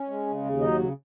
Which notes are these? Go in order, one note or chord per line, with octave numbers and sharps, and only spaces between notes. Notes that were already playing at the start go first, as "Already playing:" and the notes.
Already playing: C#4
G#3
C#3
D#2
F#3 D#4 D#5
C#3